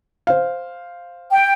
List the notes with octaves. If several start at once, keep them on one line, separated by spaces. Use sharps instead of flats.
C5 F5
G5